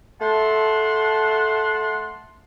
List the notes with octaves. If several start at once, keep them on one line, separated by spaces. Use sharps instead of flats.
A3 F#5 A5 C6